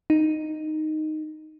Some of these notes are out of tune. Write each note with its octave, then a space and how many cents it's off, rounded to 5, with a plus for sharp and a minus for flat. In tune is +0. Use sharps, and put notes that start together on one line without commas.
D#4 -5